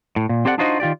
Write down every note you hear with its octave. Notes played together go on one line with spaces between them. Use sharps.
A2
A#2
C4 G4 A4 D5 F5 F#5
D4 D#4 F4 F#4 C5 D#5
D#3 F4 G4 D5